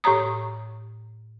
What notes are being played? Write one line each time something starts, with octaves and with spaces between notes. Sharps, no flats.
A2 G4 C#5 A#5 D#6